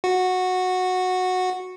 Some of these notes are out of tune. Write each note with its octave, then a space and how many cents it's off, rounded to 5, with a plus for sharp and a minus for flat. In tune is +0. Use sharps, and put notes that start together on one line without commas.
F#4 -10